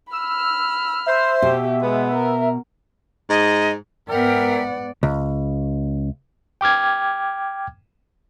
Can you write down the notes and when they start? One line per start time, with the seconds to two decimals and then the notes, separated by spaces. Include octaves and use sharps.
0.12 B5 E6 F6
1.06 C5 E5
1.42 B2 G4
1.81 G#3 B3
2.15 A#4
3.30 G#2 D#5
4.09 G#2 B3 A#4 D5 E5 F#5 G5
5.03 C#2
6.61 G5 D6 F6 G#6